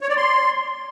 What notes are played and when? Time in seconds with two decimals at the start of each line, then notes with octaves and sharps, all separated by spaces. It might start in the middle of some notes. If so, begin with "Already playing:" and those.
0.01 C#5
0.09 D5
0.17 C6